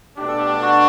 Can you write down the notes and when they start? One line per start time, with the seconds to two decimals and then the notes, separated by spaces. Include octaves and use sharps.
0.17 B2 A3 D4 G4
0.27 A4
0.37 G4
0.62 F#4